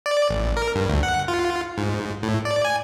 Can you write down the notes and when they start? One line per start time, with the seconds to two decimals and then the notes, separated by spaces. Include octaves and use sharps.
0.06 D5
0.29 A1
0.57 A#4
0.75 G2
0.89 D2
1.03 F#5
1.28 F4
1.78 G#2
2.23 A2
2.45 D5
2.65 G#5